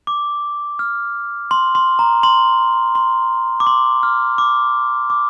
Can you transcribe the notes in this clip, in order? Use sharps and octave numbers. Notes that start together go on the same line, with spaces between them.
D6
F6
C6
C6
A#5
C6
C6
D6
C6
F6
D6
D6